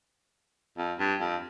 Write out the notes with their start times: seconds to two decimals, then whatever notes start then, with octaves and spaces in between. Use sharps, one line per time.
0.77 F2
0.99 G2
1.20 F2